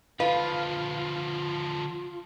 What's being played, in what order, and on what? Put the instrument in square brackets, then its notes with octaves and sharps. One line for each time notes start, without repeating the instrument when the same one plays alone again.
[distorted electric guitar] D3 F3 [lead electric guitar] F4 [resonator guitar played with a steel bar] B4 [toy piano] F5